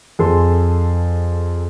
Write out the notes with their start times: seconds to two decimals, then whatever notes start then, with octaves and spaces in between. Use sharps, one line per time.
0.19 F2 G#4 A4 C6